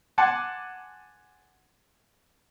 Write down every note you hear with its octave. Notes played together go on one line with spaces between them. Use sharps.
F#5 G#5 A5 C6 D6